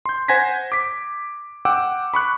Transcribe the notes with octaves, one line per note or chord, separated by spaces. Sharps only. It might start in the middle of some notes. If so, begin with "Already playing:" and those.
C6 G6
C5 F#5 G#5 G#6 A#6 B6
D6 B6
F#5 G5 D6 E6
B5 C#6 F#6